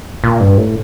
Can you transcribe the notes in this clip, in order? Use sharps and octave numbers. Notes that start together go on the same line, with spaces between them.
A#2
G2
A2